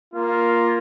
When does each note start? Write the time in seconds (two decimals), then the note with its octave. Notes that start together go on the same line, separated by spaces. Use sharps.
0.14 A#3 F4